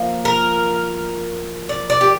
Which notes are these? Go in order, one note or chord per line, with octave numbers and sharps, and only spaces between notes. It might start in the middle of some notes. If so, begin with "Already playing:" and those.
Already playing: F3 A#3
A#4
D5
D5
G4